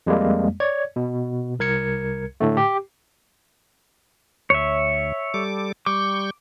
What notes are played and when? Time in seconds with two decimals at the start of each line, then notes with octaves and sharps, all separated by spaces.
0.07 F2 G3 G#3 A#3
0.60 C#5 D5 G#6
0.96 B2
1.59 C2 A#4 G#6 C#7
2.40 A2 D3 A3
2.57 G4
4.50 D2 C#5 E5
5.34 G3 A4 D6
5.86 G3 C#6 D6 G6